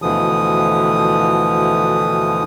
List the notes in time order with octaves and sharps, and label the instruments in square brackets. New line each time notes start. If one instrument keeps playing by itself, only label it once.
[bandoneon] D2 B2 D3 E3 F3 D#6